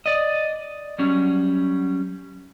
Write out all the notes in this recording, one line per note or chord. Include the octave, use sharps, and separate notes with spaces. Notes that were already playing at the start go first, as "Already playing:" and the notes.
D5 D#5
F#3 G3 C#4